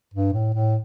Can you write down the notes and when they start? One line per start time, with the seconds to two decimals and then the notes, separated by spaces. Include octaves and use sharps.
0.14 G2
0.33 A2
0.54 A2